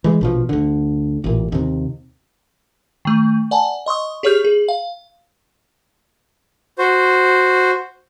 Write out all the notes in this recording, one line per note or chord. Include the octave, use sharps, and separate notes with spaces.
E3 G#3
A#1 B2 F3
D2 D3
A1 A#2
D#2 C3
D#3 A3
D5 F#5 G#5 A5
D#5 C6 C#6 D#6
G4 G#4 C#5 C#6 F6 G6
G#4
F5
F#4 C5